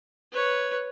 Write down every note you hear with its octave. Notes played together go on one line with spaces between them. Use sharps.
B4 C#5